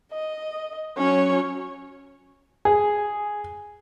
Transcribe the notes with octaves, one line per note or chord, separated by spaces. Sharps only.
D#5
F#3 C#4 C#5
G#4